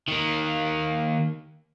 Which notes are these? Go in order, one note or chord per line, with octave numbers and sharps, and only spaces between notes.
D#3 A#3